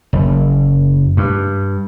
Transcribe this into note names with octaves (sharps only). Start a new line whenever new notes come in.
F#1
G2